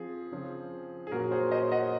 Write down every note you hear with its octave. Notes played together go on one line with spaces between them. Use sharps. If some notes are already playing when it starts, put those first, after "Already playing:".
Already playing: F3 C4 G#4
C#3 F3 C4
G#4
A#2 F#3 A#3 C#4 F#4 A#4
G#4 C5
C5 D#5
D#5 F#5